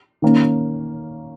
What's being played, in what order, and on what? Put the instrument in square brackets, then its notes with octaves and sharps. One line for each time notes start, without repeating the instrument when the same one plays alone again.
[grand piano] D#3 A#3 C#4